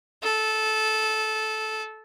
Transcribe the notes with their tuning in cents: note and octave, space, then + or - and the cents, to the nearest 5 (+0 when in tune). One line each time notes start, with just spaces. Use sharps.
A4 -15